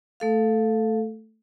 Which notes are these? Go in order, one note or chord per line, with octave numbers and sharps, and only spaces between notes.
A3 A4 F5